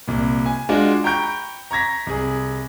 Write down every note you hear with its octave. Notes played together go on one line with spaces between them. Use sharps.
C2 A#2
G#5
G#3 D4 F4 F#4
G5 A#5 B5 C#6 G6 D7
A#5 C#6 G#6 A#6 B6
C2 G#4